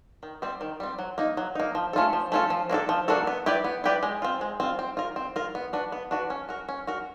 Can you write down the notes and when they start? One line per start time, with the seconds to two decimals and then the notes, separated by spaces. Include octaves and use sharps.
0.23 D#3
0.42 G3 C4
0.61 D#3
0.80 G3 C4
0.99 F#3
1.18 A#3 D#4
1.37 F#3
1.55 A#3 D#4
1.75 F3
1.93 A3 C#4 F4 A4
2.13 F3
2.32 A3 C#4 F4 A4
2.50 F3
2.69 A#3 D4 F#4 A4
2.89 F3
3.08 A#3 D4 F#4 A4
3.27 B3
3.46 E4 G4 B4 D5
3.64 B3
3.84 E4 G4 B4 D5
4.03 G#3
4.22 C4 F4
4.41 G#3
4.60 C4 F4
4.79 C4
4.97 F4 A#4
5.16 C4
5.36 F4 A#4
5.55 B3
5.73 D4 F#4 B4
5.92 B3
6.11 D4 F#4 B4
6.30 C#4
6.49 F#4 A#4
6.69 C#4
6.87 F#4 A#4